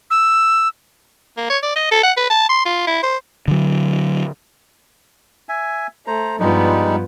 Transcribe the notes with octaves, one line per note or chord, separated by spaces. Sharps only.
E6
A#3
C#5
D5
D#5
A4
F#5
B4
A5
C6
F4
E4
C5
D3 F#3
E5 G#5
A3 C5 A#5
G2 F3 G3 G#3 B3 D#4